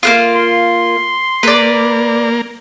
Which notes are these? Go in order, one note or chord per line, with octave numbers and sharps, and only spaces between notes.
A#3 B3 F4
C6
A#3 B4 D5